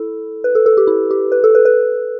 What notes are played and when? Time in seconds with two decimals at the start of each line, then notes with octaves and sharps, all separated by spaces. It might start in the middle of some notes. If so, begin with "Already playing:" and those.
Already playing: E4 A4
0.44 B4
0.55 A4
0.66 A4
0.77 G4
0.87 E4
1.11 G4
1.32 B4
1.44 A4
1.55 B4
1.65 B4